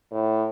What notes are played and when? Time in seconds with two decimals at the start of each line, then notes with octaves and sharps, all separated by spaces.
0.11 A2